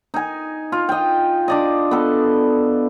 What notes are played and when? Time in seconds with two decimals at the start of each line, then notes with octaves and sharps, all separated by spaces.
0.14 D#4 G#5
0.72 F4
0.89 D#5 G5
1.48 D4 D5 D#5
1.91 B3 A4